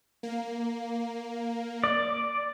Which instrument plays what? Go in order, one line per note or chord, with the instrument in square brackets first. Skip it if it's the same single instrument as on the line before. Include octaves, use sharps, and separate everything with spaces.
[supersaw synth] A#3
[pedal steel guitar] D5